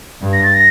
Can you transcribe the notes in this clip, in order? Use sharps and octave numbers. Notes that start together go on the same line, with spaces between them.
G2
A#6
A6
A#6